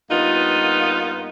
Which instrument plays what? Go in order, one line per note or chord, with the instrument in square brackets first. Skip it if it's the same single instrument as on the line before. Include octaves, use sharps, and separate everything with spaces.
[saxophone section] G2 A#3 B3 D#4 F4